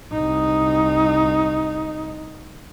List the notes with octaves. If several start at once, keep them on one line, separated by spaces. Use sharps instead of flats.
C2 D#4